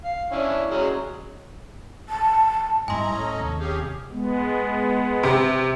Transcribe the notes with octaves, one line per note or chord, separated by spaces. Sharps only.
F5
C#4 D4 E4
F#3 G#3 C#4
A5
G#2 G3 E4 D#5 G#5 A#5 C6
A2 C#4 A4
D#2 C3
C#4 G4 G#4 F5 G5
G#3 B3
C3